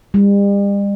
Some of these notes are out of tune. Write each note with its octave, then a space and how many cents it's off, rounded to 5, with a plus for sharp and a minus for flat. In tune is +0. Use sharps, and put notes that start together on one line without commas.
G3 +40